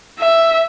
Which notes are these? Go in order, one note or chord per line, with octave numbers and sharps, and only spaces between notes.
E5